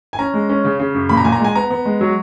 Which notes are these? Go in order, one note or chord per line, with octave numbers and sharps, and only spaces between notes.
G#5
C#4 A#5
G#3
C#4
C#3
C#3
F#2
A#2 B5
A#5
A#2 G#5
A#5
G#3 G#5
B3 A#5
B3
G#3
F#3